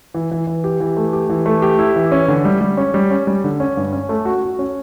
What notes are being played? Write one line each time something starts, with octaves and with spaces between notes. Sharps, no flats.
E3
E3
E3
G4
E3
A3
G4
E3
A3
G4
E4
E3
C#4
D3
G3
G3
C#4
G3
C#4
G3
D3
C#4
G2
C#4
A3
F#4
F#4
C#4